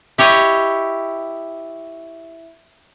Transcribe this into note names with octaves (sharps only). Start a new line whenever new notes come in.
E4 G4 C#5 D#5